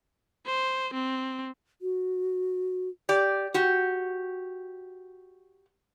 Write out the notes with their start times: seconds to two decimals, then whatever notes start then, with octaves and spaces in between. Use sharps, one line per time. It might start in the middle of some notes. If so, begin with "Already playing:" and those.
0.46 C5
0.94 C4
1.82 F#4
3.09 G4 D5
3.54 F#4 G4